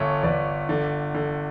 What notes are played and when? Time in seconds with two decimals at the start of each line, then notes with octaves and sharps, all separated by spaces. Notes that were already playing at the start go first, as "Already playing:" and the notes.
Already playing: G1 C#5 E5
0.23 G1 B4 D5
0.69 D3
1.15 D3